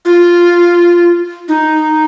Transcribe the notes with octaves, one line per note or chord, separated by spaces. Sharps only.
F4
D#4